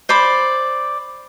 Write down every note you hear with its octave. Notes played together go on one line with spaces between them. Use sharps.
C5 D5 B5